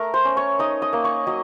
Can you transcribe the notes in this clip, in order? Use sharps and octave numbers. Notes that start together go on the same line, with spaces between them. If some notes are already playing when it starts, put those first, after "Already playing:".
Already playing: A3 A#4 A#5
C5 C6
C#4
C#5 C#6
D#4 D#5 D#6
D#5 D#6
A#3
C#5 C#6
F#3 D#5 D#6